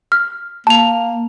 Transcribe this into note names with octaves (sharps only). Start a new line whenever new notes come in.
F6
A#3 A5 F7